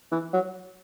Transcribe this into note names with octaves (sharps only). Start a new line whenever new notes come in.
E3
F#3